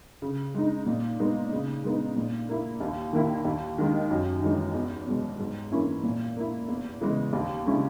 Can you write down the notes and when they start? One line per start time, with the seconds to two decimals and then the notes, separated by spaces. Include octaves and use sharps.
0.22 C#3
0.54 G#3 D#4
0.86 A#2
1.19 G#3 B3 D#4
1.52 C#3
1.84 G#3 B3 D#4
2.16 A#2
2.49 A#3 E4
2.81 D#2
3.13 D#3 A#3 E4
3.45 D#2
3.78 D#3 G#3 D#4
4.10 F#2
4.43 E3 G#3 D#4
4.75 E2
5.07 B2 G#3
5.39 G#2
5.71 E3 A#3 C#4 E4
6.03 A#2
6.37 A#3 E4
6.68 E2
7.01 C#3 E3 G#3
7.33 D#2
7.66 C#3 G#3 C#4 E4